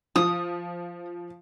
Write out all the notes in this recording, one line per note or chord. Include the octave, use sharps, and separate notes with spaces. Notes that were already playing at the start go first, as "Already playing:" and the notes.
F3 D#6